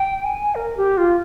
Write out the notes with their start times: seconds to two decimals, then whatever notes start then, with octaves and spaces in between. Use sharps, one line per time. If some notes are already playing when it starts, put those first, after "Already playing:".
Already playing: G5
0.25 G#5
0.55 A#4
0.77 G4
0.97 F4